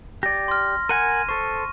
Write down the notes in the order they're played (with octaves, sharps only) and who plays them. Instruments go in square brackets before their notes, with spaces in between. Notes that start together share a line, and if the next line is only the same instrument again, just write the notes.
[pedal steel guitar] G4 D5 [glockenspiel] A#6
[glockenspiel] C6 F6
[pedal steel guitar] A#4 F#5 G#5 [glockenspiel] D#7
[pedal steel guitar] A4 C5 [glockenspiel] C#6